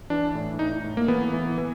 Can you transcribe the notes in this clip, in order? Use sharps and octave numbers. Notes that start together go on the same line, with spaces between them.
E3 D4
A2
A2 D#4
A2
A#3
E3 B3
E3
E3